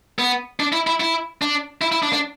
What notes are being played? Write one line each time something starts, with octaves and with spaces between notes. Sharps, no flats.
B3
D4
E4
E4
E4
D4
E4
E4
D4
D4